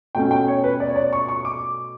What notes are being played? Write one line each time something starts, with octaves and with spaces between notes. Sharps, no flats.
B2 A3 C#4 G5
G5
C#5
B4
D5
C#5
D5
C#6
C#6
D6